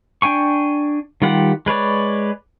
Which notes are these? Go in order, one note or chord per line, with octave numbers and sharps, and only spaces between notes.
D4 G5 G#5 C#6
D#3 G3 F4 G4 F#5
G#3 B4 C#5 D5